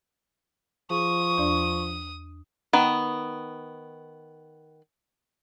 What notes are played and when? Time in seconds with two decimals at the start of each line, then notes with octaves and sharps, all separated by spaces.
0.90 F3 G#4 C#6 D#6
1.38 E2 D4 D5
2.73 D#3 B3